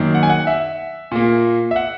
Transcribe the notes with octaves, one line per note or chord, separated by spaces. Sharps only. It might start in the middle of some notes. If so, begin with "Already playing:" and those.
Already playing: F#2 D#3 A#3
F#5
G#5
F#5
E5
A#2 A#3
E5
F#5